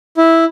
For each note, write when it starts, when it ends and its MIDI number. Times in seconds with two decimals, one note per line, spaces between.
0.18 0.44 64